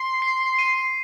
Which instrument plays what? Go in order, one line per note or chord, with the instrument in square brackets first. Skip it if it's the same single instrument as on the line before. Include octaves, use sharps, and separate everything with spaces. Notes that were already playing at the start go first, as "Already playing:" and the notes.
Already playing: [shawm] C6
[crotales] C7
D#7